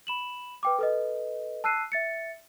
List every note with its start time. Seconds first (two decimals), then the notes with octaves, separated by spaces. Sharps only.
0.07 B5 E7 F#7
0.63 B4 G5 D6
0.79 A4 B4 D#5
1.64 A5 E6 F#6 C7 D#7
1.92 E5 A6 C#7